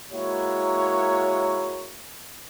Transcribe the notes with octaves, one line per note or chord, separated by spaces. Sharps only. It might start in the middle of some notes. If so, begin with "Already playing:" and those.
G#3 A#3 E4 F#4 A#4 C#5